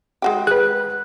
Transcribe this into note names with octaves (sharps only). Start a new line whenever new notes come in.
G#3 F#4 G4
G#4 B4 F#6